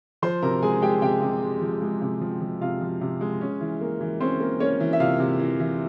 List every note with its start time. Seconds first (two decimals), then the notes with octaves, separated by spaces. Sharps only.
0.22 F3 C5 C6
0.42 C3 A#4 A#5
0.63 G#3 G#4 G#5
0.82 G#3 G4 G5
1.02 C3 G4 G5
1.22 C3
1.42 G#3
1.61 F3
1.82 G#3
2.01 C3
2.21 F3
2.42 F3
2.61 C3 F4 F5
2.81 F3
3.01 C3
3.21 G#3
3.41 C#4
3.61 E3
3.81 A#3
4.01 E3
4.20 C4 C#4 C5
4.40 A#3
4.60 A#3 C#4 C#5
4.80 E3
4.93 E5
5.00 C3 F4 F5
5.20 C3
5.40 E3
5.60 E3